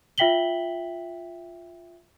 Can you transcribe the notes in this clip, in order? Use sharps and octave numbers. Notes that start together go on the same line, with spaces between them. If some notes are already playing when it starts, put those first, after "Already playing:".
F4 E5 G5 B6 F#7 G7